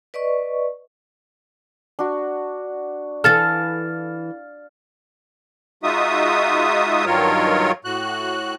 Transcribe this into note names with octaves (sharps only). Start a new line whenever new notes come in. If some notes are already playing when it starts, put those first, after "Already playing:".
B4 D5 D#5 C#6
D4 F#4
E3 A4 F5 F6 A6
G#3 D#4 F4 F#4 E5 D#6
G2 D#3 F#3 F4 A#4 C#5
A2 F#4 F#6